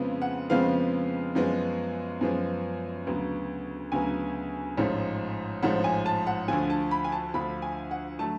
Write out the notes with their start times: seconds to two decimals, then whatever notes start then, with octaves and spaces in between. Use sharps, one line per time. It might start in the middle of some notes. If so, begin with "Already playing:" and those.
Already playing: F2 C#3 F3 G#3 B3
0.22 F#5
0.50 F2 C#3 F3 G#3 B3 F5
1.35 F#2 F3 G#3 B3
2.21 F#2 F3 G#3 B3
3.07 D2 C#3 F#3 B3
3.92 D2 C#3 F#3 B3 G#5
4.77 A1 G#2 F3
5.62 A1 G#2 F3 F#5
5.84 G#5
6.06 A5
6.27 F#5
6.48 D2 D3 F3 G#5
6.70 A5
6.91 B5
7.04 G#5
7.12 A5
7.34 D2 D3 F3 B5
7.62 G#5
7.91 F#5
8.19 D3 F#3 A3 A5